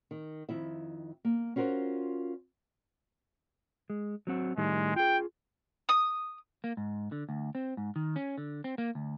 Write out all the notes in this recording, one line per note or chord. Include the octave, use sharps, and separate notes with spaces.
D#3
F2 D#3 E4 E5
A#3
C#4 F4 F#4 A#4 C5
G#3
F#3 C4 F#4
A2 D#3 G3 G#3
F4 G#4 G5
D#6
A#3
G#2
D3
D2
C4
G#2
D#3
C#4
D3
C4
A#3
D2